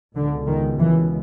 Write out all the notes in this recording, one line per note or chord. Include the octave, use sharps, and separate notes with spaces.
C#2 B2 D3
D#3
E3